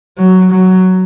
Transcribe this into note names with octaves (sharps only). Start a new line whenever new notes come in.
F#3
F#3